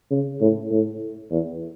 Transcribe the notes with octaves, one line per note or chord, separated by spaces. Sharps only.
C#3
A2
A2
E2